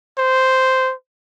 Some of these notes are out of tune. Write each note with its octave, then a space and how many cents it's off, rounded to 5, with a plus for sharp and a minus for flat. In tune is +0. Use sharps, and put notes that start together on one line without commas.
C5 -5